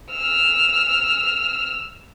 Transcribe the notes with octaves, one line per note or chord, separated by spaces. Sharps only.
E6 F6